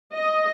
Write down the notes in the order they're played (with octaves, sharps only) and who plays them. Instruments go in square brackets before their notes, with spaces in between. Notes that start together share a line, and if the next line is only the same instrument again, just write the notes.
[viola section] D#5